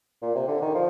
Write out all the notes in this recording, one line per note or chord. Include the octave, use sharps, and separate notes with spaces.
A#2
C3
D3
D#3
F3